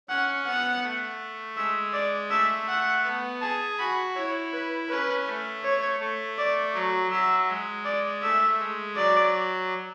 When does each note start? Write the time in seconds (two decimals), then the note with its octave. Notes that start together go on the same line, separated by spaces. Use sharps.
0.09 C#4 F#5
0.46 B3 F#5
0.83 A3
1.57 G#3 E5
1.93 D5
2.30 A3 E5
2.68 F#5
3.05 B3
3.41 G#4 A5
3.79 F#4 B5
4.15 E4 C#5
4.53 B4
4.90 C#4 B4
5.26 A3
5.64 C#5
6.00 A3
6.38 D5
6.75 F#3
7.11 F#3 E5
7.49 G#3
7.85 D5
8.22 A3 E5
8.59 G#3
8.96 F#3 D5